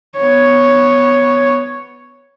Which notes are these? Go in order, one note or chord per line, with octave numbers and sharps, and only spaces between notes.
B3 C#5